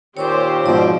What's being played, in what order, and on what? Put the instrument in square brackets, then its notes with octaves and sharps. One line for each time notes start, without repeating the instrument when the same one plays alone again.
[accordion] A#2 D#3 C4 [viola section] G4 C5 [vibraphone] C#5 C#6 D6
[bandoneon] G#2 B2 F3 [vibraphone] D5